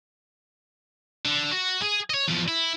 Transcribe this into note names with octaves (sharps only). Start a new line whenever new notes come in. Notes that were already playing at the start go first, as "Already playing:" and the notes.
D3
F#4
G#4
C#5 D#5
E2 F3
E4